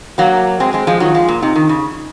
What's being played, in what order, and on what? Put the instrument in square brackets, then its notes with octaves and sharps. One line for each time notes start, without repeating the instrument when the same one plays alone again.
[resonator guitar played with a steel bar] F#3 A#3 [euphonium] F#4
[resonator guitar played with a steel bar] G#3 C4
G#3 C4
F3 G#3
[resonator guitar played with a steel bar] D#3 F#3 [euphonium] F4
[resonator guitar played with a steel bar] F3 G#3
A#2
[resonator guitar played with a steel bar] C3 [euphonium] D#4
[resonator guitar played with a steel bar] D#3
C#3